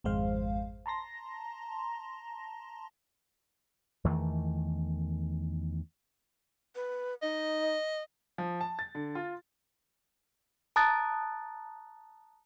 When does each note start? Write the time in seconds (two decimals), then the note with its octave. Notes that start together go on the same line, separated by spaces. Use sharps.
0.04 G#1 F2 G#3 C5 F5
0.86 A5 A#5 C6 A#6
4.04 E2 D#3 E3 A3
6.75 B4
7.22 D#4 D#5
8.38 F3
8.61 A5
8.79 A6
8.95 D3
9.15 F4
10.76 A5 A#5 D#6 F#6 A6